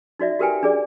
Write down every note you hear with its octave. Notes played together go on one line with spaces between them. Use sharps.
D#4 F#4 D5 E5
F#4 G4 A#4 B4 G5 G#5
D4 G#4 D5